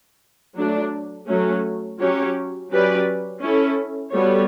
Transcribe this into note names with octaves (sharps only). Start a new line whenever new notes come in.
F#3 A3 D4
F#3 A3 C#4
F#3 C#4 G4 C#5
F#3 C#4 G4 B4 D5
C#4 E4 A4
G3 B3 F#4 A4 C#5